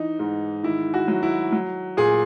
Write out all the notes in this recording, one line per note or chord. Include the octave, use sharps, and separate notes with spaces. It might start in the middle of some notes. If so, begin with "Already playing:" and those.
Already playing: E3 D#4
G#2
D#3 E4
F#4
F#3
E4
F#3
A#2 G#4